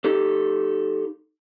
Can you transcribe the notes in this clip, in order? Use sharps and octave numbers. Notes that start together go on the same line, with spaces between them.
D#4 G4 A4